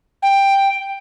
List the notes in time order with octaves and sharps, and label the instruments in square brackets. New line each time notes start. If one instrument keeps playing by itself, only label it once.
[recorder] G5